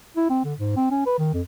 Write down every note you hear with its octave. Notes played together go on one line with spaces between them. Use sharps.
E4
C4
D3
G#2
C4
C#4
B4
D#3
F2